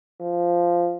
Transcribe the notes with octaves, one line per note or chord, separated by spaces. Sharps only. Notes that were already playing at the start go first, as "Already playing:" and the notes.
F3